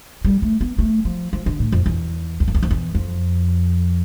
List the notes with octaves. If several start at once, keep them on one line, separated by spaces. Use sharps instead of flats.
G3
A3
B3
A3
F3
F3
D3
A2
F2
E2
E2
F2
E2
F2
E2
F2